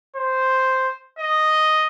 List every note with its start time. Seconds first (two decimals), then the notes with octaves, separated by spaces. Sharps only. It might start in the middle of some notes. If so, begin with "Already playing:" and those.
0.16 C5
1.19 D#5